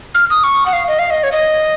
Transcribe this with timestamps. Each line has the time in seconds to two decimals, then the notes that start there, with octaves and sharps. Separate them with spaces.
0.15 F6
0.30 D#6
0.44 C#6
0.66 F#5
0.73 F5
0.88 D#5
0.99 F5
1.10 D#5
1.23 C#5
1.32 D#5